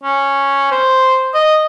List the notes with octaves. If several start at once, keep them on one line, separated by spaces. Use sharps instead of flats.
C#4
C5
D#5